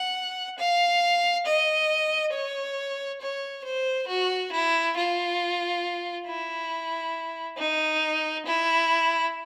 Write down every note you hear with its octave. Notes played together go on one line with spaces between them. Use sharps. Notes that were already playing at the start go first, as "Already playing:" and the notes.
Already playing: F#5
F5
D#5
C#5
C#5
C5
F#4
E4
F4
E4
D#4
E4